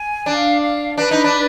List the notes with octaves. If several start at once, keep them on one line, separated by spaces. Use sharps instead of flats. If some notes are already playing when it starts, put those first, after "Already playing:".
Already playing: G#5
D4 F5
F5
D4 B4
D#4
D4
D5